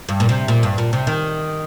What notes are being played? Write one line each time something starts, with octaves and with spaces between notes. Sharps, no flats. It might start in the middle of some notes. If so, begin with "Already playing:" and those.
G2
A#2
C3
A#2
G2
A#2
C3
D#3